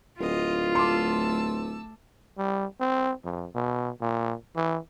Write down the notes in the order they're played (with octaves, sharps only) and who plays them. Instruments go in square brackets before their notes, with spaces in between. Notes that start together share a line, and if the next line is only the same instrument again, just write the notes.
[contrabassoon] D1 [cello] F4 [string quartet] D#5
[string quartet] A3 A5 E6 [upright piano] C6 D6
[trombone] G3
C4
F2
B2
A#2
E3